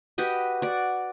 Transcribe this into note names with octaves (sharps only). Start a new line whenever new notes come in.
F#4 G4 B4 D#5
F#4 D5